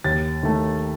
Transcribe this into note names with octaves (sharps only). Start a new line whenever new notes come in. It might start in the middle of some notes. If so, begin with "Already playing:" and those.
D#2 A6
D#3 A3